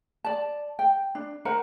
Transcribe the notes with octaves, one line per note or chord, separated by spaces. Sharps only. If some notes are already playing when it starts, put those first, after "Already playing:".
D5 A5
G5
D4
A#4 C5 F#5 A#5